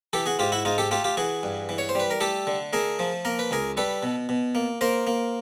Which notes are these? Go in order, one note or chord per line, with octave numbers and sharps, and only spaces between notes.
E3 G4 A4
F#4 G#4
G#2 F4 G4
E4 F#4
G#2 D#4 F4
G4 A4
A3 F4 G4
F4 G4
E3 F#4 G#4
G2
E3
C#5
C5
G3 B4
A#4
A3 G4 A4
D3
A3 G#4 A#4
F3
A#3 A#4
B4
C#2 G#4 A#4
G3 A4 B4
B2
B2
A#3
A#3 A#4 C5
A#3